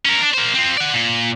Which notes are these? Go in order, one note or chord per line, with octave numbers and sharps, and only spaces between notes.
C#4 A#4
D4
A#3 C5
C4 F4
D5 F#5
A#2